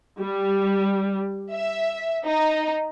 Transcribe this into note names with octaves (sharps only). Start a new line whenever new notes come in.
G3
E5
D#4